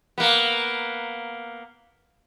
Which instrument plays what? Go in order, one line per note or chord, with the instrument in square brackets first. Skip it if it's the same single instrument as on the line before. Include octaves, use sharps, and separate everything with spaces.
[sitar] A#3 B3